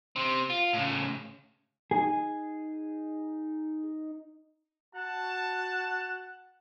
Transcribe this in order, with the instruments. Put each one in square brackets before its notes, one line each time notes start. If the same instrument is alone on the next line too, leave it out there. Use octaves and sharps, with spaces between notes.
[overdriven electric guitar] C3 C4
F4
A2 C#3
[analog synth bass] D#4 [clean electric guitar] G#4
[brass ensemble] F#4 A5 [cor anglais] F#5